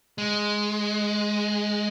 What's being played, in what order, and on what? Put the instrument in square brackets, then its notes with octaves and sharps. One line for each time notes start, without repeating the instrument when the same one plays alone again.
[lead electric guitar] G#3